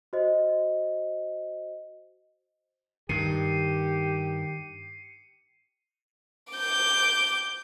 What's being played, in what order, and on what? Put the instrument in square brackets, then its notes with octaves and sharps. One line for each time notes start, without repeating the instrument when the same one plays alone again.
[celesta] F#4 C5 D#5
[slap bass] G2 D#3 [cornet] G4 [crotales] C7 C#7 D#7
[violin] D6 G6